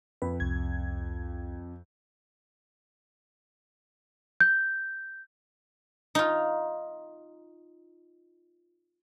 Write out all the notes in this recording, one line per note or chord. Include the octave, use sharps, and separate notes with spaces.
F2 B4
C2 G#6
G6
D#4 F4